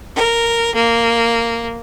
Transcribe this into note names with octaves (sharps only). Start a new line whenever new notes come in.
A#4
A#3